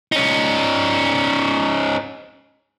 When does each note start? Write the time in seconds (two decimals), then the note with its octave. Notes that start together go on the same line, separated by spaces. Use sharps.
0.12 C#4 D#4